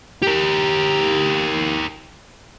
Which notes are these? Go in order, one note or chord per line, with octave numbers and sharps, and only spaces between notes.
G4 A#4